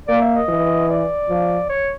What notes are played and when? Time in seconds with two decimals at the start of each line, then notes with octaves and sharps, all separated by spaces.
0.08 A#3 D5
0.21 E5
0.35 D#5
0.48 E3
0.90 D5
1.29 F3
1.69 C#5